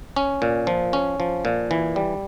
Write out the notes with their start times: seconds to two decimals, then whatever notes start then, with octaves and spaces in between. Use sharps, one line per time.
0.16 C#4
0.42 A#2
0.67 F3
0.93 C#4
1.20 F3
1.45 A#2
1.71 E3
1.96 G3